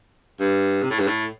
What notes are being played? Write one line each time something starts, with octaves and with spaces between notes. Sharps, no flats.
G2
C3
A2
G2
A2